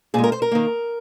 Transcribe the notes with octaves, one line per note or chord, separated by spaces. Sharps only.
A#2 G#3 G#4
A#4
C5
A#4
D#3 A#3